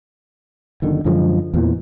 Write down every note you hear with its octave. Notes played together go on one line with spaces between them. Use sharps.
F#1 D3 D#3
F#2 D3 F3 G#3
E2 A#2 E3